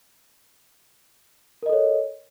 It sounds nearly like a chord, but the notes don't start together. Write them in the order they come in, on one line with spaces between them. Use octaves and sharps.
A#4 D#5 A4 C#5